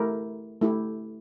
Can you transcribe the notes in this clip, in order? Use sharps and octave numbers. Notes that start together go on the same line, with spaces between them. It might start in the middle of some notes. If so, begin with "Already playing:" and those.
Already playing: A3 E4 G4 A#4
A3 E4 G4